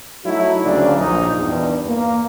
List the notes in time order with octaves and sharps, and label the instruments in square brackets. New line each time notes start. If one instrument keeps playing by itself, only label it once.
[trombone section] F#3 A3 D#4 E4 F#4
D2 C#3 F#3 A#3 D4 F4
A#1 D#4
E2 G2
A#3